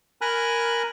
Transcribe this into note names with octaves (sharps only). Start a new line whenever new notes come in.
A#4 G#5 A#5 B5 F6 F#6